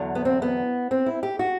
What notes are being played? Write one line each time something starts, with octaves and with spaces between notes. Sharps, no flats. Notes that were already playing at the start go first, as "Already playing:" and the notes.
Already playing: E2 D3 F#3
B3
C4
B3
C4
E4
G4
F#4